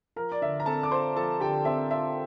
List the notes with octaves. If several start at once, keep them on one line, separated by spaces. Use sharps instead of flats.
F3 A#4 A#5
D5
D3 E5
A#5
C4 A4 A5
D6
F4 C5 C6
F3 A4 A5
D3 G4 G5
C4 E5
F4 E5